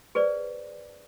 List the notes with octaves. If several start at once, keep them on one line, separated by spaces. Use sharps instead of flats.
G#4 B4 C5 D5